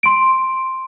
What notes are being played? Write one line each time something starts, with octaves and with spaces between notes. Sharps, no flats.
C6 D7